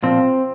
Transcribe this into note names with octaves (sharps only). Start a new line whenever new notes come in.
A#2 F3 C4